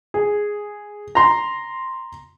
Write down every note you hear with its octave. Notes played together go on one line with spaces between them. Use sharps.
G#4
A#5 C6